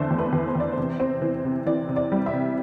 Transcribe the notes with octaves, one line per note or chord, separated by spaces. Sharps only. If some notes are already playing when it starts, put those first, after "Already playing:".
Already playing: E2 D3 A3 C5 D5
E2
B4
E2
C5
E2 D5
C5
C3
C4
E3
C3
E3 D5
C3
D5
G3
E5
C3